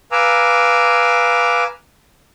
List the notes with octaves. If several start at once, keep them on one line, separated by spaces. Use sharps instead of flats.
B4 F5 G#5 A#5 D6 E6